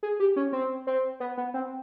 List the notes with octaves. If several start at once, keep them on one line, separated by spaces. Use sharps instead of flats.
G#4
G4
C#4
C4
C4
B3
B3
C4